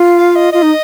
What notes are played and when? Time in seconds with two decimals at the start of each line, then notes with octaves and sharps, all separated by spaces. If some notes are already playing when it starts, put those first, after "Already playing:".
Already playing: F4
0.18 F5
0.36 D#5
0.53 F4 D#5
0.62 D#4